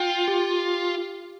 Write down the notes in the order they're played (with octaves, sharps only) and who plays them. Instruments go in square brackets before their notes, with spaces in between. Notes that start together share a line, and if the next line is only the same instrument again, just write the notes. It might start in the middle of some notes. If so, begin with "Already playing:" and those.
Already playing: [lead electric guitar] F4 [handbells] G5
[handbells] G4